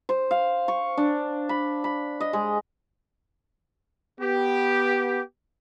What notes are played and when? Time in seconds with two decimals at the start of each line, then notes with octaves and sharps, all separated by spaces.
0.09 C5
0.31 F5
0.68 C#6
0.98 D4
1.49 B5
1.84 B5
2.21 D#5
2.33 G#3
4.20 B3 G4